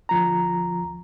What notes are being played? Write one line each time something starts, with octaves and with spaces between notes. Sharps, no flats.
D2 F3 A#5